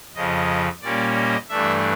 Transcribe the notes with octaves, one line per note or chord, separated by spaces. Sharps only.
F2 C#3 F3 D#5
A#2 G3 A#3 C#4 D5
D#5
G2 E3 A3 D4 E5